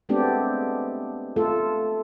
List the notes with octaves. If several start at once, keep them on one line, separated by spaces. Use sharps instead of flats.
G#3 A3 B3 C4 D4 G4
A3 F4 A4